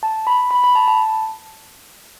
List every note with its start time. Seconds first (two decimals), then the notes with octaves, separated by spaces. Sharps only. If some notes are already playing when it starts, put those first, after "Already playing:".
0.03 A5
0.27 B5
0.51 B5
0.64 B5
0.75 A5
0.88 A5